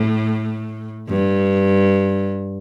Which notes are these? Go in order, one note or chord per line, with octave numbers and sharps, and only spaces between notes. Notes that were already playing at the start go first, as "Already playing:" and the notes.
Already playing: A2
G2